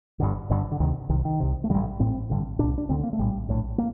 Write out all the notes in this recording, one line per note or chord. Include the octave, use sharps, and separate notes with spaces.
G1 G2 D3
G1 G2 D3
D3
D2 C3 D#3
C2 C3 D#3
D#3
C2 C3
A3
A1 G2 D3 G3
A1 A2 C4
A1 G2 D3
C2 A#2 D4
D4
D2 D3 C4
A#3
A3
A#1 A2 G3
A#1 A2
A#3